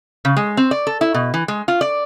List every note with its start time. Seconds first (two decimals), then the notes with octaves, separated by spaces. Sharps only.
0.25 C#3
0.37 G#3
0.57 C4
0.71 D5
0.87 A4
1.01 E4
1.14 B2
1.34 E3
1.48 G#3
1.68 F4
1.81 D5